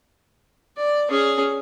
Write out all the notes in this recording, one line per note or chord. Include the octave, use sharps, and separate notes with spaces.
D5
C#4 G#4